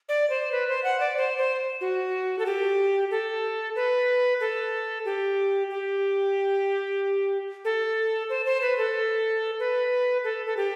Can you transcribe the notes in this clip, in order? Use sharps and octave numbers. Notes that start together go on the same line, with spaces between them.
D5
C5
B4
C5
F#5
D5
C5
C5
F#4
A4
G4
A4
B4
A4
G4
G4
A4
C5
C5
B4
A4
B4
A4
A4
G4